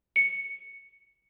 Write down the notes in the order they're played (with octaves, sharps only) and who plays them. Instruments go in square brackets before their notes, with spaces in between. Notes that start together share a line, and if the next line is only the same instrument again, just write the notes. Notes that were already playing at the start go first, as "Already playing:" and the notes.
[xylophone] C#7